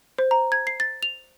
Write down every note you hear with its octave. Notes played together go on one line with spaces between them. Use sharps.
C5
A#5
G#6
C7
A6
F7